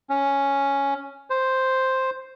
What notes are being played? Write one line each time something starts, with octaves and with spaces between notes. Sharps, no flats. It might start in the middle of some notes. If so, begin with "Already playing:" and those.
C#4
C5